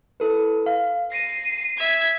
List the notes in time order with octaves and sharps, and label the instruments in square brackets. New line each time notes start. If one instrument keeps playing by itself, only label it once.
[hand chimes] E4 A4 B4
F5
[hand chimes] A#6 [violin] C7 D#7
[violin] E5 G#6